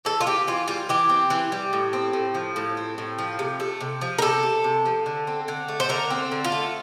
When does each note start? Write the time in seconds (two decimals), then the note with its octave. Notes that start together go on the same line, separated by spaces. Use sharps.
0.05 E3 A4
0.20 F4
0.26 C4 G4
0.47 E3 F4
0.68 G3 F4
0.89 E3 G4
1.10 C4
1.30 E3
1.52 G3
1.73 A2
1.93 C4
2.13 A2
2.35 F3
2.56 A2
2.77 C4
2.98 A2
3.19 F3
3.39 C3
3.60 A3
3.81 C3
4.01 F3
4.18 A#4
4.22 C3 A4
4.43 A3
4.64 C3
4.86 F3
5.06 D3
5.27 C4
5.48 D3
5.68 A3
5.80 C5
5.89 D3 A#4
6.10 C4
6.31 D3
6.44 F4
6.52 A3